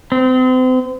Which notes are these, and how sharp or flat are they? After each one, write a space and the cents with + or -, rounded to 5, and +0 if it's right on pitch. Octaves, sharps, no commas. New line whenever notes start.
C4 -35